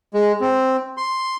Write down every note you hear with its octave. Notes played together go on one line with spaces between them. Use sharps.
G#3
C4
C6